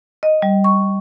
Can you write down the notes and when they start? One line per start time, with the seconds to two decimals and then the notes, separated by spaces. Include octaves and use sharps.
0.23 D#5
0.42 G3
0.64 C#6